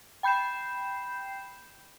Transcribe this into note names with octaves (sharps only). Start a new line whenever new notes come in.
G5 B5 G6 C7 E7